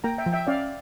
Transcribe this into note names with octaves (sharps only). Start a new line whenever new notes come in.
A#3 G5 A#5
E5 G5
F3
E5 G5
C#4 D5 F5